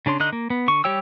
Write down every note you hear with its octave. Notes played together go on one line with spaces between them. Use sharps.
C#3 D4 C#5 C6
D3 D#4 D#5 F#6
A#3
B3
D3 C#6
G3 G4 C#5 G5 E6